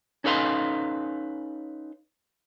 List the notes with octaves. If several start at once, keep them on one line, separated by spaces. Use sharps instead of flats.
C#4 D#4 A4 B4 F5 C6